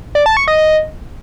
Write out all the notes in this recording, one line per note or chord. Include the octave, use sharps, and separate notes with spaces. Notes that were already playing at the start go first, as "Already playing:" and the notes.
D5
A5
C#6
D#5
D#5